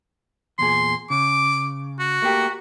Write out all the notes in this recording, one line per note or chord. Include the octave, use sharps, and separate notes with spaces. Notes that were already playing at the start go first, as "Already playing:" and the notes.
E2 A#2 G#4 C6
C#3 D6
F#4
A3 A#3 G4